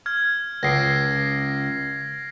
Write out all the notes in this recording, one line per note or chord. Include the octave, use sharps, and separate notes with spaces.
F6 G#6
C#2 A#6 C7 D7